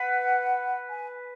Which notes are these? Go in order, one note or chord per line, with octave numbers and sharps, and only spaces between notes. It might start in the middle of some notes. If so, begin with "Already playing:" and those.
Already playing: B4 F#5
G#5